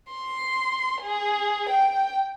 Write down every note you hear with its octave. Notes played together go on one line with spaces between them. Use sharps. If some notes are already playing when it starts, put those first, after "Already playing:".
C6
G#4
G5